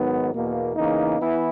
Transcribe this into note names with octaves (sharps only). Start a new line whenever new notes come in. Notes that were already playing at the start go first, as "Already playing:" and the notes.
Already playing: G#2 D#3 F#3 B3
E2 B2 A#3
E2 C#3 E3 A#3 D#4
E3 B3 E4